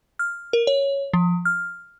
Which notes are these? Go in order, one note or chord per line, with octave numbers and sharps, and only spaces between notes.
F6
A#4
C#5
F3
F6